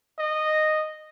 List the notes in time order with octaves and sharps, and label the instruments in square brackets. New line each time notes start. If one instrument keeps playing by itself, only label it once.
[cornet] D#5